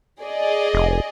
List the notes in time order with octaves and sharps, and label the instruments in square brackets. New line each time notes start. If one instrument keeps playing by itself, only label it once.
[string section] G#4 D5 D#5
[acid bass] F1